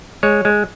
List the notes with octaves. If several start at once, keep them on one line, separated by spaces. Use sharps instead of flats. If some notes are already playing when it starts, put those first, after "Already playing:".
G#3 C#5
G#3